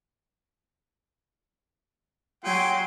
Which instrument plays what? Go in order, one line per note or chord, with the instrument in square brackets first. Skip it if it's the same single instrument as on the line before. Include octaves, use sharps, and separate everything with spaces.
[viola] F#3 C6 [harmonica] G5 G#5